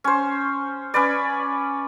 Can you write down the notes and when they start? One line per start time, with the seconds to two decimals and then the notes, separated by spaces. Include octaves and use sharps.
0.04 C#4 C5
0.94 C#4 B4 D5